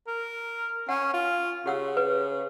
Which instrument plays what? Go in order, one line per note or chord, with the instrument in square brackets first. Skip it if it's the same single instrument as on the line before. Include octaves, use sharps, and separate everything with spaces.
[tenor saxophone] A#4
[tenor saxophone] C#4 [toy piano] F#5
[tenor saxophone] F4
[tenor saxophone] C#3 [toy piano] G4 F#5 E6
[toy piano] B4